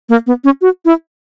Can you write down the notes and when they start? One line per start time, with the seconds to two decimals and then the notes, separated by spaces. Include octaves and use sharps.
0.09 A#3
0.27 B3
0.44 C#4
0.61 F#4
0.85 E4